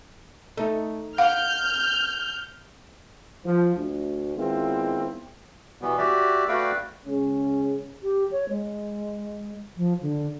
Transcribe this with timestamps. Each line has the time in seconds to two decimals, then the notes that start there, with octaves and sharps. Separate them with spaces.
0.57 A3 D#4 A4
1.18 F5 F#5 F6 G6
3.45 F3
3.76 D2
4.36 D#3 G#3 B3 C4 E4 F4
5.82 B2 E3 G3 B3
5.98 F#4 G4 D5 E5
6.48 A3 F#4 B4 D5 F5 G5
7.06 C#3 G#3 C#4
8.03 G4
8.31 C#5
8.49 G#3
9.77 F3
10.02 D3